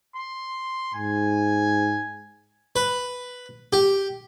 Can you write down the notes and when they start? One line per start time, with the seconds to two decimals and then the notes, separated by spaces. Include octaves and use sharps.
0.16 C6
0.94 G#2 G#5
2.76 B4
3.73 G4